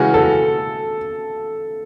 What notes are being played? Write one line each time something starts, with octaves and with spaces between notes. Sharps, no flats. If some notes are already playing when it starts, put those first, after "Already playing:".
Already playing: C#3 E3 G#3 C#4 F#4
A4